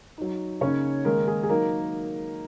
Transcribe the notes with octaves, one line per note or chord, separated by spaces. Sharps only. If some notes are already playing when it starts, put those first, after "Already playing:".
F#3 D#4
C#3 A#3 C#4 D#4 C#5
D#3 G#3 A#3 D#4 A#4
G#4
G#4
F#3 A#3 D#4 A#4